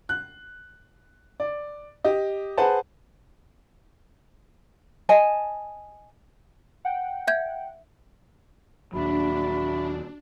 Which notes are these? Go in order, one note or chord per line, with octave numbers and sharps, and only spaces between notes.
F#6
D5
G4 D#5
G#4 B4 C5 F#5 A5
D#5 G#5 A5
F#5 G5
E5 G6 G#6
D#2 A#2 F#3 D4 F#4 E5 B5